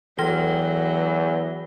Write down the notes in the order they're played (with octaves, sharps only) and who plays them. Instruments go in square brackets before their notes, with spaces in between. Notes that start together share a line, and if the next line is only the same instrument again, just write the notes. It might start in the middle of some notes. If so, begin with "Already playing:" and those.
[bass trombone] E2 [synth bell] E3 A#6 G7 [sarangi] F#3